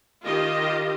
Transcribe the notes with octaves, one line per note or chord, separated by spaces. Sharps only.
D#3 F4 G4 D#5